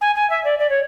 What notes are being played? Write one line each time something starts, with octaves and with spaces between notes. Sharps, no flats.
G#5
G#5
E5
D5
D5
C#5